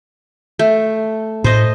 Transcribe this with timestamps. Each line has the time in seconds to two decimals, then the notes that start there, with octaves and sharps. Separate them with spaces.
0.59 A3
1.44 A2 C5 D#5